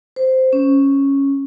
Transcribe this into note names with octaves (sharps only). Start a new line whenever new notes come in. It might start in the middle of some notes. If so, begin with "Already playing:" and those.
C5
C#4